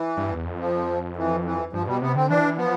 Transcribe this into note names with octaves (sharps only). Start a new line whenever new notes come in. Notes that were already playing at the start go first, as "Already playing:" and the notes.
Already playing: E3
G2
E2
F2
F3
E3
E3
G2 F3
B2 G3
C3 B3
D3 C4
E3 D4
F3 B3